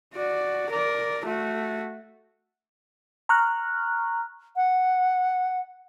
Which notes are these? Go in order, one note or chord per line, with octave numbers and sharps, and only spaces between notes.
F#4 D5
A#4 D5
A3 F#4
A#5 C#6 F6 F#6
F#5